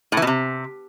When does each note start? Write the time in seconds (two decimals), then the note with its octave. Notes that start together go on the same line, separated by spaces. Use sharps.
0.12 A2
0.17 E3
0.22 B2
0.27 C3